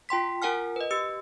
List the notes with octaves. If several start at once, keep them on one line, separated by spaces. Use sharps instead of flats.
F4 G5 C6 B6
F4 A#4 F#5 G#5 F6
B4 D#5
G4 E6